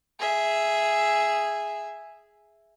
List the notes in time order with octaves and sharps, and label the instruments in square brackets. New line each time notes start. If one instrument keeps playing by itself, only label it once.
[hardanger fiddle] G#4 E5